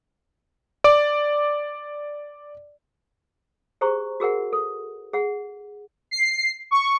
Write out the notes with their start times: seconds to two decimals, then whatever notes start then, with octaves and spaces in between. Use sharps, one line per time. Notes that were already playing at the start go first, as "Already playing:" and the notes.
0.84 D5 D6
3.81 G4 G#4 C5 A#5 C#6
4.20 F#4 G#4 A#4 F#5
4.53 A4
5.13 G#4 F#5
6.11 C7
6.71 C#6